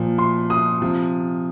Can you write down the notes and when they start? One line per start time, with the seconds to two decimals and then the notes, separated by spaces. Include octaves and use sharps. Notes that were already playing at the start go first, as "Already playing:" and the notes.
Already playing: A#2 F3
0.18 C6
0.50 D#6
0.82 C3 F3